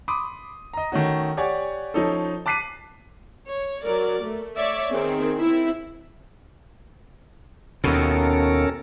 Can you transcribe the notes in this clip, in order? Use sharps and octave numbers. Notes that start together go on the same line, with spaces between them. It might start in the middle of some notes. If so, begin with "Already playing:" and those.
B5 C6 D6 D#6
D#5 A#5
D#3 A3 C#4 F#4
G4 C#5 D5 F#5 G#5
F3 C#4 D#4 A4
A5 D6 F#6 B6 C7 D#7
C#5
F#3 A#4 D5
A3
C#5 D5 E5
D#3 C4 G#4
C4 E4
D#2 B2 C#4 A4 A#4